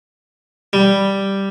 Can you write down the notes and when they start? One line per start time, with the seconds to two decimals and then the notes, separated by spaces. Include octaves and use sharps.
0.73 G3